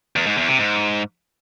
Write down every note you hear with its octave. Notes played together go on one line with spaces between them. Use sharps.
E2
G#2
E2
C3
G#2